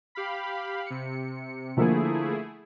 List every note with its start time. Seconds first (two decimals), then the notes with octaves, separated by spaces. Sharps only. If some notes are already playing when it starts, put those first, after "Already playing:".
0.15 G4 F5 B5
0.86 C3 C#7
1.77 D3 F3 A3 A#3 E4 G#4